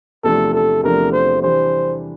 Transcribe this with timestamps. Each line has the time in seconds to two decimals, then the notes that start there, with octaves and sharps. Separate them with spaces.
0.24 E2 C3 F3 A3 D4 A4
0.53 A4
0.83 E2 C3 F3 A3 D4 A#4
1.12 C5
1.42 C3 E3 G3 D4 C5